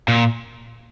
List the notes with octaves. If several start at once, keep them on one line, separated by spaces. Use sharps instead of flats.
A#2